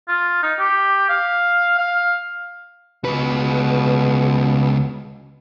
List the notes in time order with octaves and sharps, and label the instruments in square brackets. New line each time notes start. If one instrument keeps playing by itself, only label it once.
[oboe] F4
D#4
G4
F5
F5
[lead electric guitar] C#2 B4 [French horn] B2